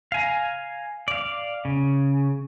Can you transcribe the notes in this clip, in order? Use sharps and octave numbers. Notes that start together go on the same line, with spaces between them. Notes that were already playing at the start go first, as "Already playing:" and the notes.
F5 G#5 A#5
D5 F5
C#3